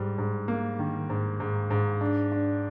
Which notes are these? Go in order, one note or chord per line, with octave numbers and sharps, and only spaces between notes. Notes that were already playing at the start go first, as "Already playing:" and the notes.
Already playing: G#2 G3
G#2
A#3
D#3
G#2
G#2
G#2
D4
D4